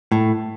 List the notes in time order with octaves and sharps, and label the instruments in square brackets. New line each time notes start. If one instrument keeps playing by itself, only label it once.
[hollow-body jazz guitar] A2